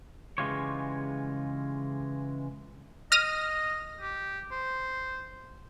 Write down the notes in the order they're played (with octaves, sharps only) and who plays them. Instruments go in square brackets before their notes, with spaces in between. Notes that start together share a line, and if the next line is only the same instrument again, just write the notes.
[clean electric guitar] C#3 E3 G#3 F4 G4 C#5
[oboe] D#5 [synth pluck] F6 A#6 D#7
[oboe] G4
C5